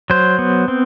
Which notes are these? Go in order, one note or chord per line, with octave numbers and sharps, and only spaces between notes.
F#3 C5
B3
C4